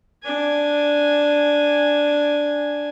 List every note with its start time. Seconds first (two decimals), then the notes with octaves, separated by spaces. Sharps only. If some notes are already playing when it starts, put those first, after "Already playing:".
0.24 D4 G#5